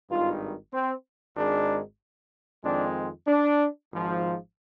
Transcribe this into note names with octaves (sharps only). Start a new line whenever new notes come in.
G#1 G2 D#3 F4
C4
G#1 G#2 D#3 G#3 D4
F2 D#3 G#3 C4 D4
D4
G#1 G#2 F3